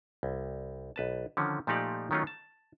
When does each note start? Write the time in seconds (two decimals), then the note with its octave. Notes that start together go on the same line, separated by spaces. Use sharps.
0.23 C2
0.96 B1 B4 A5
1.37 D3 D#3 F3 C#4
1.67 A#2 F3 A3 D#4 G4 D5
2.11 D#3 F#3 A3 C#4 D#4 F4
2.27 A5